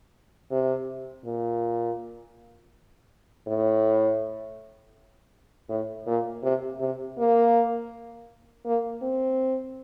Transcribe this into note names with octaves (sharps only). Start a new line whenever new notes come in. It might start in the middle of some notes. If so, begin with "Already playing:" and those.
C3
A#2
A2
A2
A#2
C3
C3
A#3
A#3
C4